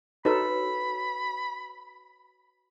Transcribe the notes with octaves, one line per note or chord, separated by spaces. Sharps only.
D#4 F#4 A4 B4 C#5 B5